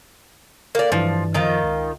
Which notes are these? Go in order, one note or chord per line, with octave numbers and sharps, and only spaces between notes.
A#3 D5
G2 E3 F3
F#2 D#3 F3 F4 G5
C#2